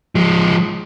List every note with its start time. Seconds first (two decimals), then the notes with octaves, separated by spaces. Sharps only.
0.15 F3 G#3